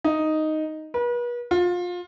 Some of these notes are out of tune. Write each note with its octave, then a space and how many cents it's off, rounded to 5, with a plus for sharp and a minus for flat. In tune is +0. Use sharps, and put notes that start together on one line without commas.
D#4 +0
B4 -40
F4 +25